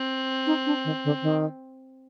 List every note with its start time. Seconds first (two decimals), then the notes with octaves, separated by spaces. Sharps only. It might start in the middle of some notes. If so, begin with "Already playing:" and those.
Already playing: C4
0.47 D#4
0.66 D4
0.85 D#3
1.05 D3
1.22 D#3